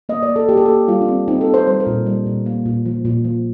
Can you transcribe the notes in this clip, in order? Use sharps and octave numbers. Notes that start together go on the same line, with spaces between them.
A#3 D#5
D5
A#3
A4
A#3 G4
A4
A#3 G4
G3 F4
D4
C4
C4 D#4
A4
C4
C5
G3 C5
A#4
A#2
G3
A#2
A#3
A#2
F3
A#2
F3